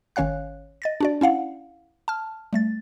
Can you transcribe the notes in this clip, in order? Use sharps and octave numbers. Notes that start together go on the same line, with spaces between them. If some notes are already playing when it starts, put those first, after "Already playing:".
G#1 D#3 C#4 C#5 F5 F#6
D#5 A6 A#6
D4 F#4 D5
C#4 E4 F5 F#5
A5 F6
G3 A3 A6